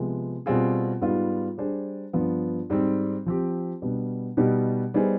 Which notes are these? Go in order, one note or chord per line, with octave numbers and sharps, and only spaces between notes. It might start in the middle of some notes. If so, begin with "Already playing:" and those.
Already playing: C3 F3 G#3 B3
B2 G3 C4 F4 G#4
G#2 G3 B3 F4
G3 D4 G#4 C5
G2 F3 B3 F4
G#2 G3 C4
F3 C4 G4
B2 G3 B3 D4
B2 G3 B3 D#4 G4
G3 B3 D#4 G#4 C5